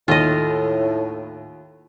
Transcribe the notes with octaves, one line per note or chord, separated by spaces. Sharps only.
D#2 A2 F4 D#5